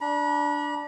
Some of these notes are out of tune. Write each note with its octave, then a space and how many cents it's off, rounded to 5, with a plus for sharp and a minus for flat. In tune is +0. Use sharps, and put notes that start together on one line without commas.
D4 +0 B5 -45